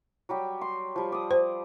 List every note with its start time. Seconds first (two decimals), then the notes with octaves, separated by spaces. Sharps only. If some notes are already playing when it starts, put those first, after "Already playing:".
0.29 F#3 G3 G4
0.61 C6
0.96 F3 G3
1.12 D5 D#6
1.31 C5